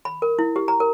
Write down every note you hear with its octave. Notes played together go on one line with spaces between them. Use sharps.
B5
A#4
E4
G4
A#5
A#4